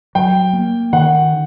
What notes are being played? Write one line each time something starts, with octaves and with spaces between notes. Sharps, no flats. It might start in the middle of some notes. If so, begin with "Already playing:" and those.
F#3 G5
A#3
D#3 F#5